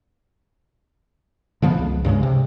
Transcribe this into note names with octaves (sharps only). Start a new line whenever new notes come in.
D3 F3 A#3 B3
C#2
G2 C#3 E3 G#3
C3